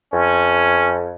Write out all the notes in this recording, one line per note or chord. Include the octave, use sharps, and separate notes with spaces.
F2 C#4